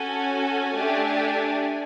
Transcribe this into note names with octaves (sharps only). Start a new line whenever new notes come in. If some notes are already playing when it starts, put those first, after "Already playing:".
Already playing: C#4 F#4 A4 G#5
A3 D4 G4